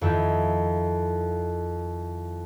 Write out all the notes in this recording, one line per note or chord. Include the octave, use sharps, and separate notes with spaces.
F2 D#3 E4